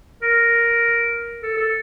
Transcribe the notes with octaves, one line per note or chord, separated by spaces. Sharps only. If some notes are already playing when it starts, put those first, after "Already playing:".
A#4
A4
A4